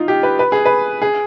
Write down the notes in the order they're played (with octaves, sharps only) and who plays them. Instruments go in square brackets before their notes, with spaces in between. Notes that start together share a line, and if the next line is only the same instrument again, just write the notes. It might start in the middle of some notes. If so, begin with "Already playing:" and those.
Already playing: [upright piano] D#4 F4
G4
B4
B4
G#4
B4
G#4